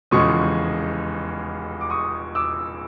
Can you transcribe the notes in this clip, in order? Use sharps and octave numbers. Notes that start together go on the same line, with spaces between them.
F1 E2 C#3 F3 G#3 C#6 D#6
D6
C#6 D#6
D6 E6